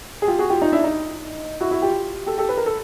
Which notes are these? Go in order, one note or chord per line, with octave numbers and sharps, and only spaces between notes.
G#4
F4 G4
F#4 G#4
F4 G4
D#4 F4
D4 E4
D#4
E4 F#4
E4 F#4
F4 G4
G4 A4
G4 A4
B4
A#4
A4